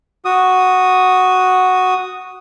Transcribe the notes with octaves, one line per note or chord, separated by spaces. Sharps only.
F#4 D#6